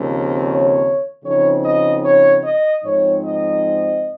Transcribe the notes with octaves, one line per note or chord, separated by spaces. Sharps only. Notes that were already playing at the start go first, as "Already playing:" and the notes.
Already playing: D#2 C#3 F3 C4
C#5
C#3 F3 C4 D#4 C#5
D#5
C#5
D#5
G#2 F3 C4 D#4 C#5
D#5